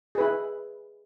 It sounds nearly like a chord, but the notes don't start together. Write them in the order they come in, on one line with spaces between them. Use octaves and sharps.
G#4 B4 E4